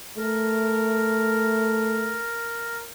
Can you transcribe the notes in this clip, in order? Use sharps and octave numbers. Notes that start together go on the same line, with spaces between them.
A3 A#4